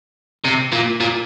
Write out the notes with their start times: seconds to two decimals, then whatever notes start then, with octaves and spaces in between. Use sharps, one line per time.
0.45 C3
0.73 A#2
1.01 A#2